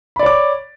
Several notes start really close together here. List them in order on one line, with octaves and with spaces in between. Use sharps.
B5 D5 C#5 D6